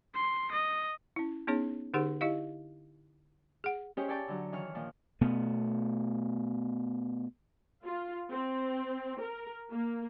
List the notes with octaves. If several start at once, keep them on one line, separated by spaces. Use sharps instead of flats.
C6
D#5
C#4 E4
B3 C#4 D#4 G#4 C#5
D3 D#4 G4 G#4 C5 F#5
E4 G4 D#5 F5
G#4 F#5
C#4 G4 G#4 C5 C#5 D#5
E4 C#5 D5 G5 A5 D6
D3 F#3
D#3 E3 C#5 F6
A#2 D#3 F3
B2 A3 B3
F4
C4
A#4
A#3